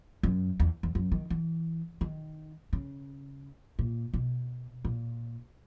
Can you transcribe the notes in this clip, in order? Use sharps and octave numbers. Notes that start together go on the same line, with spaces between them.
F#2
E2
E2
F#2
D#3
E3
D#3
C#3
A#2
B2
A#2